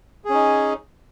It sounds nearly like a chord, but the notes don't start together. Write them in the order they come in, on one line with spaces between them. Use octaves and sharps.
G#4 C#4 D#4